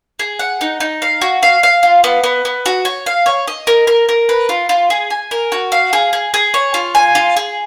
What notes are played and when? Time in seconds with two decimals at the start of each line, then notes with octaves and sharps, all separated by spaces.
0.19 G#4
0.39 F#5
0.61 D#4
0.80 D#4
1.02 F5
1.22 F#4
1.43 F5
1.63 F5
1.83 F4
2.04 B3
2.24 B3
2.45 B3
2.66 F#4
2.85 C#5
3.06 F5
3.26 C#5
3.48 D#5
3.67 A#4
3.87 A#4
4.09 A#4
4.29 B4
4.49 F4
4.69 F4
4.90 G#4
5.10 G#5
5.31 A#4
5.52 F#4
5.72 F5
5.93 G#4
6.13 G#4
6.34 G#4
6.54 C#5
6.74 F4
6.95 G#5
7.15 F4
7.37 G#4